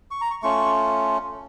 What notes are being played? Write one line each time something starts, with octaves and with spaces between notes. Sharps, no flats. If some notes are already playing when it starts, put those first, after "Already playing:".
C#6
A#5
C#6
A3 C#4 F4 C#6